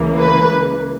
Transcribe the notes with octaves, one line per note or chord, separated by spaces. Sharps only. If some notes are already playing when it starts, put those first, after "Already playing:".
Already playing: C#2 C#3 E3 A#3
B4